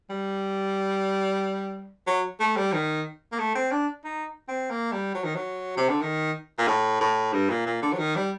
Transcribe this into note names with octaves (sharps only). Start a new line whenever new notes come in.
G3
F#3
A3
G3
D#3
A#3
A3
C4
D4
D#4
C4
A#3
G3
F#3
D#3
F#3
C3
D3
D#3
A#2
A2
A2
G2
A#2
A#2
D3
F#3
D#3
G3